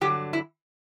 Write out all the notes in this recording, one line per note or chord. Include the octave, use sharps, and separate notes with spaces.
G2 D3 F#3 G4
E4